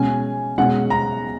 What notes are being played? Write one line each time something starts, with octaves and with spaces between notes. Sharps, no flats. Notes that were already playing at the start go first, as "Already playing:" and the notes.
Already playing: B2 G#3 C#4 G#5
B2 G#3 C#4 F#5
A#5